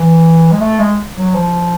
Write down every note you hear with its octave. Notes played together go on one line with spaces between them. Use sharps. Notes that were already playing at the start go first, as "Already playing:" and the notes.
Already playing: E3
G#3
A3
G#3
F#3
F3